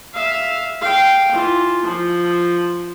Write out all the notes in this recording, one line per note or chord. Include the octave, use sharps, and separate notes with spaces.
E5 F5
F5 G5
E3 F4
F3